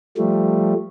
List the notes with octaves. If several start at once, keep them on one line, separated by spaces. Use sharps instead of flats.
F3 G3 A3